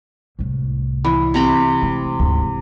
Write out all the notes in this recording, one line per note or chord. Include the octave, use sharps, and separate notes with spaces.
C2 A2
E3
C3 A#5 B5
A3
D2 G#2